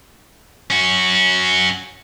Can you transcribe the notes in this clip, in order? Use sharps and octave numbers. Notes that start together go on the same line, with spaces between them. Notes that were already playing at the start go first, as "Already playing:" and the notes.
C#4 F#4